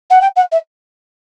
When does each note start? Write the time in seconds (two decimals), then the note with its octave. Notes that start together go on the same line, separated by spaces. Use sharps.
0.10 F#5
0.21 G5
0.36 F#5
0.51 E5